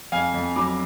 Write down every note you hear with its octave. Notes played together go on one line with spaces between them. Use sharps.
F2 F5 G#5
F2
F#3 B5 D6